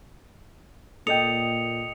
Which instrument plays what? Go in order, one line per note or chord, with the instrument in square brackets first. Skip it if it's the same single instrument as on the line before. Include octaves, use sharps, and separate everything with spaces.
[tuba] A#2 [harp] A4 D#5 G5 [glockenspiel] D#6 C#7 F7